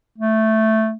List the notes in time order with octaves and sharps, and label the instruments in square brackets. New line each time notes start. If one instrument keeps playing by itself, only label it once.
[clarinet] A3